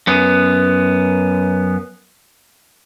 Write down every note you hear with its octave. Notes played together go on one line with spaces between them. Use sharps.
F#2 B3